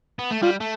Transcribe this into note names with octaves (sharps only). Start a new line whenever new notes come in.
B3
A3
G3 F4
A3